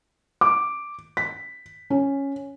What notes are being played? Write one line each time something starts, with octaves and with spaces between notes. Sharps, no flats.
D6
B6
C#4